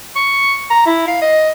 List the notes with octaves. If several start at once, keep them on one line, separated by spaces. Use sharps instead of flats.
C#6
A#5
E4
F5
D#5